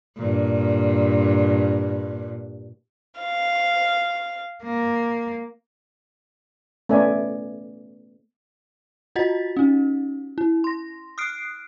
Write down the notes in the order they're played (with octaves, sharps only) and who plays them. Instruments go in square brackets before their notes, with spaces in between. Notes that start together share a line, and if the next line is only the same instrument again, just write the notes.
[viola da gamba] G2 A#2
[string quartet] F5
A#3
[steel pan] A3 B3 C#4 D5 E5 G#5
[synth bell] F4 F#4 D#5 F#5 A6 B6
C#4 D#4
E4
C6 A#6
D#6 F6 F#6 C7 D7